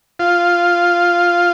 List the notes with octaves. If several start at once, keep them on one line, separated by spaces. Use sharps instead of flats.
F4